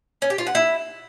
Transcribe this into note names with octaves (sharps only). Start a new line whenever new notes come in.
C#4
G4
F4
F#5
E4